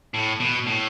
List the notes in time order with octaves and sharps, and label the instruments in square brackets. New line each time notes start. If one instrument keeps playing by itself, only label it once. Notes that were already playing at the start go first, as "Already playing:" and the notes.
[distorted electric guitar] A2
B2
A2